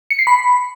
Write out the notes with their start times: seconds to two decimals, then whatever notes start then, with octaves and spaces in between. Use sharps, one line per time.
0.10 C#7
0.19 C7
0.27 B5